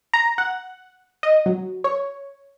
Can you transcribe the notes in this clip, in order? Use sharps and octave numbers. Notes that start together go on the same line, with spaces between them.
A#5
F#5
D#5
F#3
C#5